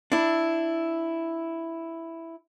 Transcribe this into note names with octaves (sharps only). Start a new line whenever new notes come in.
D4 E4